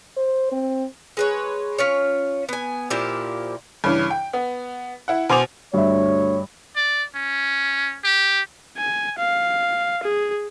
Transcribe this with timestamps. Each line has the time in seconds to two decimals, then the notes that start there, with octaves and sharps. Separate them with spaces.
0.17 C5
0.52 C4
1.17 G#3 B4 C#5
1.78 C#4 F4 C#5
2.49 B3 G#5
2.90 A#2 F3 E4 G4
3.84 G2 C#3 E3
4.10 G5
4.33 B3
5.08 E4 F#5
5.29 B2 C5 G#5 D6 F7
5.74 D2 G2 C#5 E5
6.76 D5
7.15 C#4
8.04 G4
8.77 G#5
9.19 F5
10.03 G#4